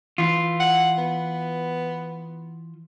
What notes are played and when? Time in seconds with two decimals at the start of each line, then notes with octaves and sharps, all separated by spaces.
0.18 E3 F4
0.60 F#5
0.98 B3